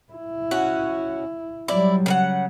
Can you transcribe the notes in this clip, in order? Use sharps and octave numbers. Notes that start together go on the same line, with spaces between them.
E4
C#4 F#4
F#3 G3 E4 D5
C#3 A#4 F#5